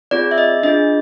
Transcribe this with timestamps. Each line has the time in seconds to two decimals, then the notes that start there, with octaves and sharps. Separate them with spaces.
0.11 C4 F4 G#4 D5
0.31 E5
0.38 D#5
0.63 D4 F4 G#4 D#5